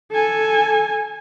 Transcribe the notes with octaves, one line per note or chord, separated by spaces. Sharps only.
A4 G#5